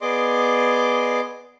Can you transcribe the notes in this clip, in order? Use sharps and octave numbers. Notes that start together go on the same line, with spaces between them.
B3 G#4 D5 D#5 C6 D6